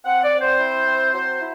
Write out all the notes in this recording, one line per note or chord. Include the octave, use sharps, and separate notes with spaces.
C4 F#5
D5
C4
C5
E4
C4
F#3 C5
E4